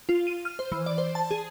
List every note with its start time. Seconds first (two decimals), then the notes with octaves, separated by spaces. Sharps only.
0.09 F4
0.27 D#7
0.45 F6
0.59 C5
0.72 E3
0.86 D5
0.98 C5
1.15 A5
1.31 G#4